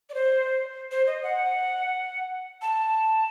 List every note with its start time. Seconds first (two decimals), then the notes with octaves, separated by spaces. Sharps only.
0.10 D5
0.14 C5
0.91 C5
1.07 D#5
1.23 F#5
2.62 A5